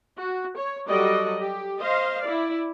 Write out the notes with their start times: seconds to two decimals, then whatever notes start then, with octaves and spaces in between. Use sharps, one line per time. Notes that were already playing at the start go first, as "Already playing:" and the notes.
0.18 F#4
0.56 C#5
0.88 F#3 G3 F#4 A4 D5 D#5
1.39 G4
1.81 C5 D#5 F5
2.23 E4 D5